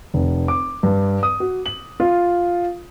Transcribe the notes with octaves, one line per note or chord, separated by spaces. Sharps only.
F1
D6
G2
D#6
F#4
F#7
F4